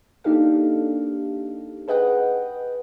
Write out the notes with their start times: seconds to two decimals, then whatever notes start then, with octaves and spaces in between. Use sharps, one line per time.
0.24 A#3 D4 D#4 G4 A4 F5
1.88 G#4 B4 D#5 F#5 G5